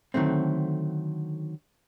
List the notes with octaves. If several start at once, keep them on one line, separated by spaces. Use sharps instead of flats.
D3 D#3 F#3 A3 C4